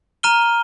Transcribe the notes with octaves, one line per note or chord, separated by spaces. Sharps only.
A#5 F6 D#7 G7